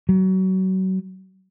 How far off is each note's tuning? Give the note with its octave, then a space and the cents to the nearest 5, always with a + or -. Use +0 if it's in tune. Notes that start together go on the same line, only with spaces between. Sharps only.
F#3 +30